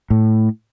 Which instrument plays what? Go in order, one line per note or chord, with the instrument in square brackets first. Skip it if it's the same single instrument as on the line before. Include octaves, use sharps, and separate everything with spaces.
[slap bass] A2